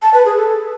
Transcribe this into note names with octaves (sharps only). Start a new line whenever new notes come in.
A5
B4
G#4
A4